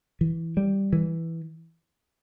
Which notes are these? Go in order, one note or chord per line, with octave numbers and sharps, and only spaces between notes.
E3
G3
E3